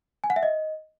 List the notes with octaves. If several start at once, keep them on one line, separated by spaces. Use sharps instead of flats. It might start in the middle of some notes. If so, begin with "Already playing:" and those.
G#5
F#5
E5
D#5